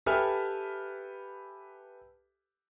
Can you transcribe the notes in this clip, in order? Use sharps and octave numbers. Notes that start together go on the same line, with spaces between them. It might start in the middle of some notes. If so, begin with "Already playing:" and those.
G4 A4 B4 E5 G#5 F6